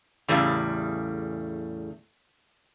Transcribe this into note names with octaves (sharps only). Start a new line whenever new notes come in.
E2 A2 C#3 G3